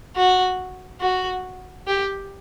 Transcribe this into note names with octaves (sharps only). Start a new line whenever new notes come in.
F#4
F#4
G4